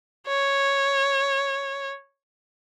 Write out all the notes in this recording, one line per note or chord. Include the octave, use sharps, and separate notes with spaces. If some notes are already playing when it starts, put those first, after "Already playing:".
C#5